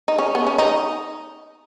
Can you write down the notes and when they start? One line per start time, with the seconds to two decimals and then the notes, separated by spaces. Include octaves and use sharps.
0.08 D#4
0.19 C#4
0.35 B3
0.47 C#4
0.58 D#4